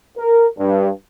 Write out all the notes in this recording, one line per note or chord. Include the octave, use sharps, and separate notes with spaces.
A#4
G2